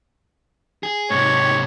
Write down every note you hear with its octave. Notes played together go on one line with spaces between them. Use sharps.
G#4
G#2 C3 C#5